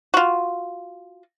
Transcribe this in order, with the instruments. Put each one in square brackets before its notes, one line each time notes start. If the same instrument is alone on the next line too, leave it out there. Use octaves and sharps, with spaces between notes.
[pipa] F4 F#4